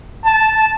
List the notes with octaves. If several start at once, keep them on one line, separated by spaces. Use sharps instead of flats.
A5